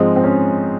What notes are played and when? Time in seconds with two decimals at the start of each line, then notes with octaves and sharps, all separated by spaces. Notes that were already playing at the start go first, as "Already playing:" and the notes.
Already playing: G#2 F3 G#3 C4 D#4
0.16 C4
0.24 C#4